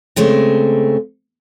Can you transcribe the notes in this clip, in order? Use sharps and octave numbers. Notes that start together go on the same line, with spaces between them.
C#3 G#3 A3 C4